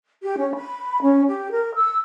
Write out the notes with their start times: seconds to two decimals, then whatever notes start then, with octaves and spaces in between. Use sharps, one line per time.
0.23 G4
0.39 C#4
0.55 B5
1.02 C#4
1.28 G4
1.52 A#4
1.75 E6